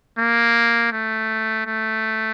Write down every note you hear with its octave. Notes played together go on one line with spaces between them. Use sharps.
A#3
A3
A3